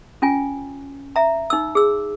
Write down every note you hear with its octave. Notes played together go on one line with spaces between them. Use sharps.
C#4 F4 G#5
E5 A#5
D#4 E6
G#4 E6